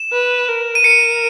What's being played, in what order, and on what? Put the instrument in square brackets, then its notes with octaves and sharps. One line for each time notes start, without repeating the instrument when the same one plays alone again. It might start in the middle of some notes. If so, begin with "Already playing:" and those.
Already playing: [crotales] E7
[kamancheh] B4
A#4
[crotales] D#7
[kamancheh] A#4 [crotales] C#7